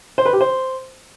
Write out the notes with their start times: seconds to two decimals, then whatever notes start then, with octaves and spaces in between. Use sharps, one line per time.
0.18 C5
0.25 B4
0.33 G4
0.41 C5